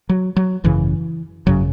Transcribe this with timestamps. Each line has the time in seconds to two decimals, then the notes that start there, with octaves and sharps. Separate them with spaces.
0.09 F#3
0.36 F#3
0.64 G#1 F#2 C#3 E3
1.46 G#1 F#2 C#3 F#3